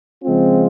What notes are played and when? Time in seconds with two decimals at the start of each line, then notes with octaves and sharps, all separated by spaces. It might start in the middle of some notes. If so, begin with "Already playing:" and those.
0.23 C#3 F3 G#3 C4 F4